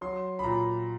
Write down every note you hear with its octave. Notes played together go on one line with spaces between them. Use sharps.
F#3 C6
B5
A#2 A#5